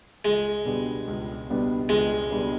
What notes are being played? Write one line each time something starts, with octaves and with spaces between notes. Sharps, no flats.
C#2 G#3
B2 G3 B3 D4
C#2
B2 G3 B3 D4
C#2 G#3
B2 G3 B3 D4